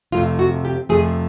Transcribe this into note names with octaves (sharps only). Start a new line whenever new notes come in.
F2 C3 F3 A3 F4
F#4
G4
F2 C3 F3 A3 G#4